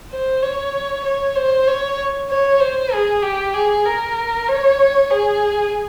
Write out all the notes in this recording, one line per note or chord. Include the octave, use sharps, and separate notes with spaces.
C5
C#5
C#5
C5
C#5
C#5
C5
G#4
G4
G#4
A#4
C#5
G#4